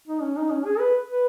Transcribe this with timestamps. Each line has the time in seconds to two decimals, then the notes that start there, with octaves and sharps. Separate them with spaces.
0.08 D#4
0.22 C#4
0.37 D#4
0.51 C#4
0.65 G#4
0.80 B4
1.09 B4